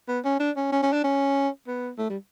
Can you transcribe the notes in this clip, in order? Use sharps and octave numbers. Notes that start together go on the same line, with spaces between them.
B3
C#4
D4
C#4
C#4
C#4
D4
C#4
B3
A3
G3